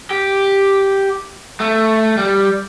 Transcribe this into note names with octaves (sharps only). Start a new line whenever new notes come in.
G4
A3
G3